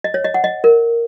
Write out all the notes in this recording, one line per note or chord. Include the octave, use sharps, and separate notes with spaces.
D#5
C#5
D#5
F#5
D#5
A#4